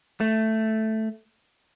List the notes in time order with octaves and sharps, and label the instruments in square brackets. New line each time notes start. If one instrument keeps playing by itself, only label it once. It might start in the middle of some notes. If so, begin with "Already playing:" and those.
[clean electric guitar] A3